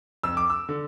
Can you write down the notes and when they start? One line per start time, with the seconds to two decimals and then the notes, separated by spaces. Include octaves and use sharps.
0.23 F2 E6
0.37 D6
0.50 E6
0.69 D3